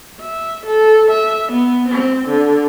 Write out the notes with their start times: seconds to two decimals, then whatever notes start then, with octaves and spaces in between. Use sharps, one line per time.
0.21 E5
0.66 A4
1.11 E5
1.52 B3
1.89 C4
2.28 D3